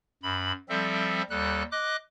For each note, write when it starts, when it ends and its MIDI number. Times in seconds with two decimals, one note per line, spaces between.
0.23 0.52 42
0.23 0.52 83
0.69 1.22 53
0.69 1.22 55
0.69 1.22 60
0.69 1.22 69
0.69 1.22 76
1.30 1.63 39
1.30 1.63 55
1.30 1.63 69
1.30 1.63 90
1.72 1.96 75
1.72 1.96 86
1.72 1.96 90